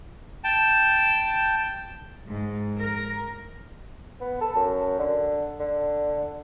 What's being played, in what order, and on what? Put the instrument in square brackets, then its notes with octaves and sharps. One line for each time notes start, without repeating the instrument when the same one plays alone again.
[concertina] G5 A5
[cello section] G#2
A#4
[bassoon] B3
A4
F#2
D3
D3